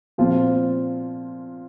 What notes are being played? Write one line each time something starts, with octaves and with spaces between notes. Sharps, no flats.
A#2 F3 C4 F4